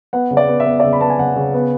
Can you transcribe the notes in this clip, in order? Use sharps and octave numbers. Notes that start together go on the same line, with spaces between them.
B3 F#5
C#3
D5
B3
E5
B3
D5
C#3 E5
B5
B3 A5
G#5
C#3 F#5
C#3
B3